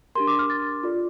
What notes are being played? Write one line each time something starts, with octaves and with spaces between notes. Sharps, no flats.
D4 G4 A#4 C6
D6
F6
A6
F4 A4 D5